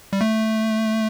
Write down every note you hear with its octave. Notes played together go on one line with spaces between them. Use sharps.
G3
A3